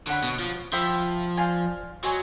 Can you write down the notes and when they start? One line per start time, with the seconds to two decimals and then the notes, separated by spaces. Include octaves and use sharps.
0.07 D3 C#5 F#5 B5
0.23 B2
0.39 F3
0.72 F3 C5 E5 G5 B5
1.37 D5 F5 G#5 C6
2.03 F#3 C5 D#5 G#5 C#6